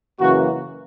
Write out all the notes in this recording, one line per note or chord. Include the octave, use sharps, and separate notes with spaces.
F#2 C#3 E3 A#3 F#4